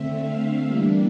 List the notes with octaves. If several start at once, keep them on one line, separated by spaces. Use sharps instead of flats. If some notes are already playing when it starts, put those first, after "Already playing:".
Already playing: D3 A3 C4 E5
F5
E3 G3 A#3 D4